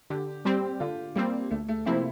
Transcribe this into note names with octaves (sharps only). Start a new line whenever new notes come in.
D3 G4
G3 C4 G4
D3 F4
G3 A#3 C4
D2 A3
A3
C3 F3 A#3 C4 E4